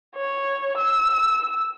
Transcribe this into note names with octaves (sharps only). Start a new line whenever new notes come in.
C#5
E6